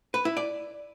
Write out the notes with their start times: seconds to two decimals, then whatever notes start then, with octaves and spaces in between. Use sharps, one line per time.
0.14 B4
0.25 E4
0.37 D5